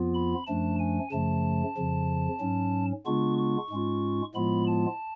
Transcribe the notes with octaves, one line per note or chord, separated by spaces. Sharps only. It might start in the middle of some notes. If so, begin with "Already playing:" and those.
Already playing: F2 F3 B3 F4
B5
F#2 F3 A3 D4 A5
G#5
F#2 C#3 F3 A3 A5
F2 C#3 F3
G#2 F#3 C#4
C#3 G#3 B3 D4 F4 C#6
C#6
G#2 G#3 C#4 F4
A2 F3 G#3 B3 F4 B5
A5